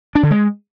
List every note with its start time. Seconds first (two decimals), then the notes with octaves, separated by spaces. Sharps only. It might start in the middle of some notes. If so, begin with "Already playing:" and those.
0.15 D4
0.23 D3
0.31 G#3